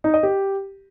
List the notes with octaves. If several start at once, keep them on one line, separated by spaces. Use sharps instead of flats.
D#4
D#5
G4